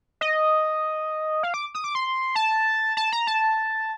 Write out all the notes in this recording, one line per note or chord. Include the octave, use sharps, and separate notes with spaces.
D#5
F5
D6
D#6
D6
C6
A5
A5
A#5
A5